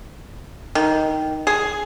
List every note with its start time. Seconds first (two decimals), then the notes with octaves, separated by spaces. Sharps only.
0.75 D#3
1.47 G#4